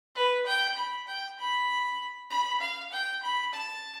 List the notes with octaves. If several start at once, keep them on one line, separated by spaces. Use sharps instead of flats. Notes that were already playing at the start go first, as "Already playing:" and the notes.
B4
G5
B5
G5
B5
B5
F5
G5
B5
A5